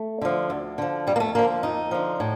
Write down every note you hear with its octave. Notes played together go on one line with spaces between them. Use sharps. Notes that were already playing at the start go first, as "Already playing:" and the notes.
Already playing: A3
D3 F3
D2
D3 F3
F2 G3
A#3
A3
D3 F3 A#3
F2 D#4
D3 F3
A2